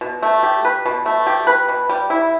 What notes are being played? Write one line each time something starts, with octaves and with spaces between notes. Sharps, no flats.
B2
A3
G4
B4
B2
A3
G4
B4
B2
G3
E4